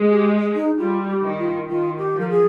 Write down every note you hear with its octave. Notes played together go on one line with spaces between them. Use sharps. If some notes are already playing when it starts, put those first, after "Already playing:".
Already playing: G#3
G4
D#4
G3 F4
F4
G4
D#3
F4
D#3 F4
G4
F3
A#4
G#4